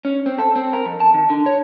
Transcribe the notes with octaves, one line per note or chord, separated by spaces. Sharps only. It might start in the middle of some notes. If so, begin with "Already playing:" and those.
C#4
C4
A4
C4
A#4
F2
A5
D#3
D3
C#5